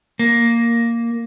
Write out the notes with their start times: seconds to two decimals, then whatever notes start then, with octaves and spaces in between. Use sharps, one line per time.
0.19 A#3